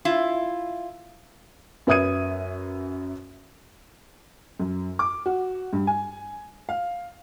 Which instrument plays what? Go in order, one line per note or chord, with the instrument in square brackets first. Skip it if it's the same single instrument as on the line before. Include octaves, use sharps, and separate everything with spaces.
[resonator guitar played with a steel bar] E4 F4
[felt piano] F#2 B4 E5 D#6 G#6 D#7
[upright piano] F#2
D6
F#4
G2
G#5
F5